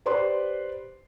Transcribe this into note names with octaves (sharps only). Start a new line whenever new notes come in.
G4 B4 C5 D5 C6